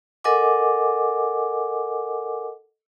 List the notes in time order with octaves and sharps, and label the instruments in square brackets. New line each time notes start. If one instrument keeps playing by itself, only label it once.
[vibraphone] A4 A#4 D#5 F#5 G#5 D6